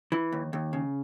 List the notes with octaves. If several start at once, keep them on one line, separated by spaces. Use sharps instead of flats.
E3
D#2
D#2
C#3